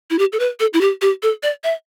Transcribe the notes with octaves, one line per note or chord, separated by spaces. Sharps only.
E4
G4
A4
B4
A4
E4
G4
G4
A4
D5
E5